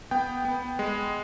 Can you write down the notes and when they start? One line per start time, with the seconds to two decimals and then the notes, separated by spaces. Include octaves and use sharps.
0.11 B3 G5
0.45 B3
0.79 G#3